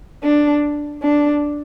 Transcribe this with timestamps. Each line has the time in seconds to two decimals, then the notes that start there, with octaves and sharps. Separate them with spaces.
0.24 D4
1.03 D4